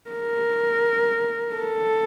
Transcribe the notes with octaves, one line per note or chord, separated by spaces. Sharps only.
A#4
A4